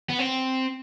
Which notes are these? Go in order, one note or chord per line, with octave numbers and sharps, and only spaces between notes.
B3
C4